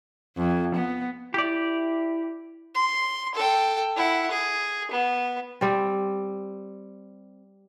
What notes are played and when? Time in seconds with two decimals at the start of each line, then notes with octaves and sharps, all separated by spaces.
0.37 F2
0.75 B3
1.34 E4 G4 D5
2.75 C6
3.35 A4 G5
3.96 E4 F#5
4.31 G#4
4.91 B3
5.61 G3 C4